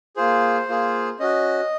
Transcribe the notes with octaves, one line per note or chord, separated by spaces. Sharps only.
A#3 F4 G#4 C5
A#3 F4 G#4
C#4 F#4 D#5